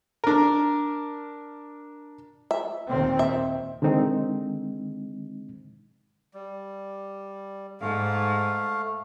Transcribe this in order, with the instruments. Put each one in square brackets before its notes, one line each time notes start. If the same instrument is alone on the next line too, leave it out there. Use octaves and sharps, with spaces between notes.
[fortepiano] D4 A#4
[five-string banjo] E5
[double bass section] D#2 A#2 C4
[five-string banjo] E5
[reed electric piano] D3 D#3 G#3 C4 D#4
[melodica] G3
[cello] G#2 [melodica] A3 F5